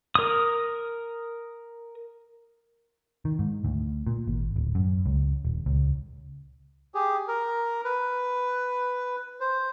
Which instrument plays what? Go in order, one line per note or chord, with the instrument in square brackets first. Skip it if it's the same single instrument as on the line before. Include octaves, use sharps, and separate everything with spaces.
[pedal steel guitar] A#4 D#6
[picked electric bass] D#3
G#2
D2
A#2
G#1
D1
F#2
C#2
D#1
C#2
[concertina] G4 G#4
A#4
B4
C5